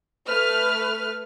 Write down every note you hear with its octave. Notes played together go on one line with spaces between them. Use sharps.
A3 B4 F6